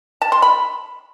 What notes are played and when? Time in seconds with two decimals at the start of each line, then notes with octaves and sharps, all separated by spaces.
0.22 A5
0.32 C6
0.42 B5